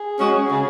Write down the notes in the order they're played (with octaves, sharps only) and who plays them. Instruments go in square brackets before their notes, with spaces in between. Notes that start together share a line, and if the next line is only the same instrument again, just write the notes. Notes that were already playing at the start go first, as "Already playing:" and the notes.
Already playing: [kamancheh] G#4
[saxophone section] G#3 C#4 F#4
C#3